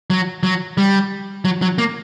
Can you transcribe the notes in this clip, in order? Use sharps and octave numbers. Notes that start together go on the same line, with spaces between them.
F#3
F#3
G3
F#3
F#3
A#3